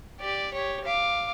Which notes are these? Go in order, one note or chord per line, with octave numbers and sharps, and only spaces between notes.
G4 D5
G4 C#5
F5 D6